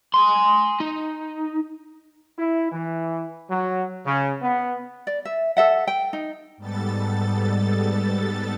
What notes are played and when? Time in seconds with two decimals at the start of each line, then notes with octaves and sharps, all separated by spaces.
0.14 G#5 C6
0.80 D#4
2.39 E4
2.72 E3
3.51 F#3
4.06 C#3
4.42 B3
5.07 D5
5.25 E5
5.57 A4 E5 F#5
5.87 G5
6.13 D#4
6.58 G#2 G3 B3 A4 A6